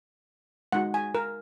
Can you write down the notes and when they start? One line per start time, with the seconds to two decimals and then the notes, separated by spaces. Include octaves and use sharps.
0.72 G#3 D#4 F#4 F#5
0.94 G#5
1.15 A#4